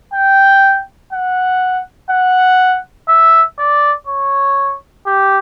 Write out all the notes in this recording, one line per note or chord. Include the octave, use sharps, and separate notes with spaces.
G5
F#5
F#5
E5
D5
C#5
G4